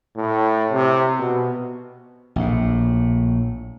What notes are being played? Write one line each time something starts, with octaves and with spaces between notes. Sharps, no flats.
A2
C3
B2
A#1 A2